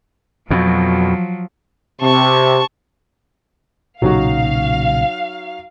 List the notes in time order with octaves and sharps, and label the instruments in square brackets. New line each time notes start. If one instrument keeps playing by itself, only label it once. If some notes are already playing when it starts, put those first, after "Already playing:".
[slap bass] F2 B2 [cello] F3 F#3
[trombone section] C3 [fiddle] A5 C#6
[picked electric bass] B1 A#2 C#3 [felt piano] F#3 D#4 F#4 [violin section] F5